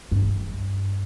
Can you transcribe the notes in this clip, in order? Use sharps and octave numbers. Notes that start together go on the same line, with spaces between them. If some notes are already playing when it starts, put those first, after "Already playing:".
G2